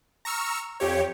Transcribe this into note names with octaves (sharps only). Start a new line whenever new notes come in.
A#5 C#6 E6 F6
F2 G4 C#5